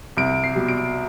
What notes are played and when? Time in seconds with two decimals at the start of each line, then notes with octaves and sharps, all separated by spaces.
0.17 C2 D7
0.44 C7
0.55 B2 G3
0.68 D7